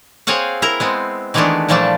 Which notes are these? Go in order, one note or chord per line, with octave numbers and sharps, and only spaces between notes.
C4 G#4 C#5 F5 F#5
E4 A#4 A#5
G#3 B3 C4
D#3 E3 G#3 A3 B3 D4
A#2 E3 F3 G3 A3 D4